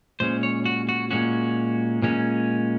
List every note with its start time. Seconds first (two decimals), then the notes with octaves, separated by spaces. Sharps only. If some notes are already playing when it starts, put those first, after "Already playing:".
0.20 A#2 G#3 C#4 C5
0.43 C#5
0.66 F#4
0.89 F#4
1.11 A#2 G#3 C#4 F#4
2.02 A#2 G#3 C#4